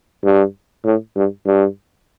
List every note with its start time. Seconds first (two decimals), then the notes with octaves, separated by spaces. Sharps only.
0.24 G2
0.85 A2
1.16 G2
1.46 G2